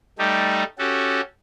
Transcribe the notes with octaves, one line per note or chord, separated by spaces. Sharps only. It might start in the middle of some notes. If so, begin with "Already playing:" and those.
G3 A3 D#4 G4
C#4 F#4 G4 A4